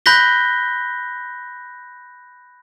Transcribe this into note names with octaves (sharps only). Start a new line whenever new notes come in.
B5 F#6 G6 A#6 B6 G7